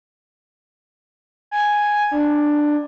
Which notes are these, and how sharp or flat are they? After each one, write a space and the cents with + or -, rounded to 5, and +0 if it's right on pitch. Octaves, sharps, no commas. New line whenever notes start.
G#5 +0
D4 +10